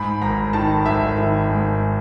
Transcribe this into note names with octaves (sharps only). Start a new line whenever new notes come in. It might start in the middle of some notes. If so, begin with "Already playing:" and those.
Already playing: G#2 B5
G#1 A#5
D#3 A5
G#1 E5
D#3
G#2